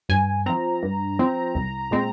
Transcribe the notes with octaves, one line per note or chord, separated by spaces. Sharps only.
G2 G#5
F3 C4 A#5
G2
F3 C4
C2
A#2 G#3 C4